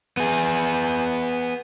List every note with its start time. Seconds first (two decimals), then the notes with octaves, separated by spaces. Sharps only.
0.17 B3 G#4